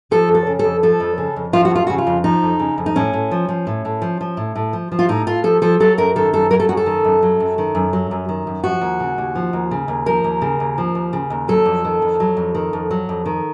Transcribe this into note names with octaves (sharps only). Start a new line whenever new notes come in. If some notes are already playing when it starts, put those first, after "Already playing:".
F3 A4
F2
A4
C#3
F2 A4
F3 A4
F2
C#3
F2
F3 F4
F#4
F2 F4
C#3 F#4
F4
F2
F3 D#4
F2
C#3
F2
D#4
A2 C#4
A2
F3
F3
A2
A2
F3
F3
A2
A2
F3
F3
F4
A2 D#4
A2 F4
F3 A4
F3 A4
F#3 A4
F#2 A#4
D#3 A4
F#2 A4
F#3 A#4
A4
F#2 F#4
A4
D#3
F#2
F#3
F#2
D#3
F#2
F#3
F#2
D#3
F#2
F3 F#4
D#2
C#3
D#2
F3
D#2
C#3
D#2
F3 A#4
D#2
C#3
D#2
F3
D#2
C#3
D#2
F#3 A4
F2
D#3
F2
F#3
F2
D#3
F2
F#3
F2
D#3